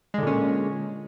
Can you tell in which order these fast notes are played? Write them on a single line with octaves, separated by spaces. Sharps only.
G#3 D3 A#2 C#4